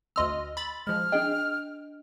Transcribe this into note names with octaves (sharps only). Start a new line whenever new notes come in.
D2 D#5 C6 E6 F6
B5 A6
F3 G#3 F6
D4 G#4 D#5 G5